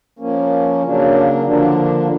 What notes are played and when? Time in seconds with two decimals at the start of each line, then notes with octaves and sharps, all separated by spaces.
0.19 F3 A#3 C#4
0.83 C#3 F#3 A#3 D4
1.45 D3 F3 A#3 D4